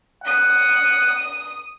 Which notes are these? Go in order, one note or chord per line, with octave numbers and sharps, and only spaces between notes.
F#5 D#6